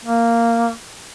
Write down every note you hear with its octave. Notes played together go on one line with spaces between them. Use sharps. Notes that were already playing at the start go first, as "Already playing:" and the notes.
A#3